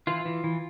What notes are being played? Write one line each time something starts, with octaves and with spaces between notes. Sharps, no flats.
E3 F4
E3
E3